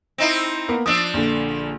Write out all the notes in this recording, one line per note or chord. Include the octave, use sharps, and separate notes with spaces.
C4 D#4 E4
A#3 B3 A#4
F3 D4 D#6 E6
A#1 D3